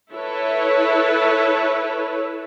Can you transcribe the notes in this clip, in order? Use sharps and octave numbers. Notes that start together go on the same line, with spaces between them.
E4 A4 B4 C#5